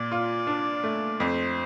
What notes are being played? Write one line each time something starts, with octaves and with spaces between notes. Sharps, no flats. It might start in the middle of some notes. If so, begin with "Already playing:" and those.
Already playing: A#2 D5
F4
D4
A3
F2 C5